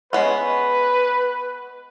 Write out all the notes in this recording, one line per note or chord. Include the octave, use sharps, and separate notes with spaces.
G#3 B3 C#4 B4